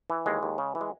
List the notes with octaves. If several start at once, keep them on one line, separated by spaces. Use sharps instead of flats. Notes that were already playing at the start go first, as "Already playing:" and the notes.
E3
D#2 G#3
D#2
C#3
E3
G#3